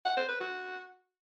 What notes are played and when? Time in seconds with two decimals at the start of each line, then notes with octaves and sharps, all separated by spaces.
0.05 F#5
0.17 C5
0.29 B4
0.40 F#4